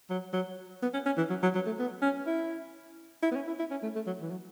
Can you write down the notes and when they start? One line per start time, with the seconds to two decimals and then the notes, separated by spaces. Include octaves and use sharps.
0.10 F#3
0.33 F#3
0.82 B3
0.94 C#4
1.06 C#4
1.17 E3
1.30 F#3
1.43 F#3
1.55 F#3
1.66 A3
1.79 B3
2.02 C#4
2.27 E4
3.22 E4
3.32 B3
3.35 C#4
3.47 E4
3.59 E4
3.71 C#4
3.83 A3
3.96 A3
4.07 F#3
4.21 E3
4.31 F#3